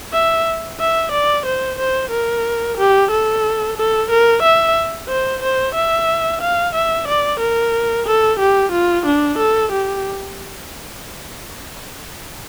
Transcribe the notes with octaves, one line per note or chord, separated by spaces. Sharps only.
E5
E5
D5
C5
C5
A#4
G4
A4
A4
A#4
E5
C5
C5
E5
F5
E5
D5
A#4
A4
G4
F4
D4
A4
G4